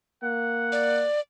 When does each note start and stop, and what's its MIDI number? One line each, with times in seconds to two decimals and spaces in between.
0.23 1.06 58
0.23 1.04 78
0.72 1.20 74